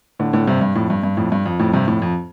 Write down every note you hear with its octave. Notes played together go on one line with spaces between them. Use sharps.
A2 D3
A2 D3
G2 C3
G2
F2 A2
G2
G2
F2 A2
G2
F2
F2 A2
G2 C3
F2 A2
F2